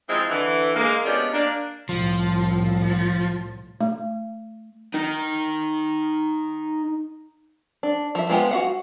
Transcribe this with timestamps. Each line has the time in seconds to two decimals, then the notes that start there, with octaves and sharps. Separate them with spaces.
0.09 D#3 F3 G#3 C4 E4 F4
0.30 D3 E3
0.76 G#3 A#3
1.05 G#3 B3 C#4 D4 F4 G4
1.33 A#3 D4
1.89 C2 A2 F3
3.81 A3
4.94 D#4 A#4
7.83 D4
8.15 F3 E5
8.30 G#3 B3 F4 G4 G#5
8.51 F#4 F5 F#5